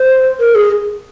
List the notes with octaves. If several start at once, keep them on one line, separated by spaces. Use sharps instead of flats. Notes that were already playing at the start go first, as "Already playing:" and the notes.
Already playing: C5
A#4
G#4